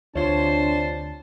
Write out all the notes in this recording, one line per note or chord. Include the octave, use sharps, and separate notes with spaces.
D2 C3 D4 F4 C5 C#5 A5